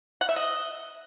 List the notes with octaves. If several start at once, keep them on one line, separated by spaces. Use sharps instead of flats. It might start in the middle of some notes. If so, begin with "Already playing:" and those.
F#5
E5
D#5